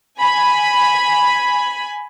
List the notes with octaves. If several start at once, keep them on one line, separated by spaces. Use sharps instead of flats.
G#5 B5